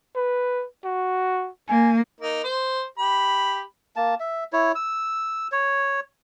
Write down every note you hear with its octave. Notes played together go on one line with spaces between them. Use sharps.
B4
F#4
A#3 G#5
A#3 D#4
C5
G4 B5
A#3 A5
E5
E4 C#5
E6
C#5